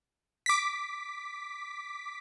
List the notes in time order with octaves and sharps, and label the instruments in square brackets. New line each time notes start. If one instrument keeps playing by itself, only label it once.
[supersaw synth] D6 B6